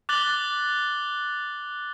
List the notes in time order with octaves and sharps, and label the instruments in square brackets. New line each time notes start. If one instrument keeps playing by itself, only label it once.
[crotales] D6 F#6 A6 F#7 G7